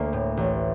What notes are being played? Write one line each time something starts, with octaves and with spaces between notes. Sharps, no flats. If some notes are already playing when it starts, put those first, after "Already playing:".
Already playing: D2 A#3
A2
A1